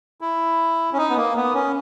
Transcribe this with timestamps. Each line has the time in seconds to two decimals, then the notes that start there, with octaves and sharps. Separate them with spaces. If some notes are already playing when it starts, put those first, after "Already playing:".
0.21 E4
0.93 C#4
0.97 D#4
1.10 B3
1.16 A#3
1.36 B3
1.55 C#4